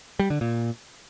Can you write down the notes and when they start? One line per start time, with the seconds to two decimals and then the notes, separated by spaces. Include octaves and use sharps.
0.19 G3
0.30 D3
0.41 A#2